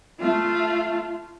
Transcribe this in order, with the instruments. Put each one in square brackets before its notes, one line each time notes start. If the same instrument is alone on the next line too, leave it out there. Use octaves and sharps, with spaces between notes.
[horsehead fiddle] A3 F4